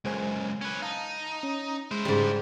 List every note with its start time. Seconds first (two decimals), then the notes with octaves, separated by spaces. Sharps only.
0.05 C#2 F#2 G#3 C5 G#5
0.61 C#4 B4
0.82 D#4 F5 A5
1.43 C#4
1.91 G#3 E4 C5
2.05 G#2 C#3 G3 A6